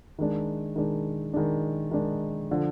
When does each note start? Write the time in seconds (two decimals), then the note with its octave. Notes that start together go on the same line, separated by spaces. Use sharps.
0.19 D#3 G#3 D4
0.76 D#3 G#3 D4
1.33 D#3 G#3 D4
1.91 D#3 G#3 D4
2.51 D3 F3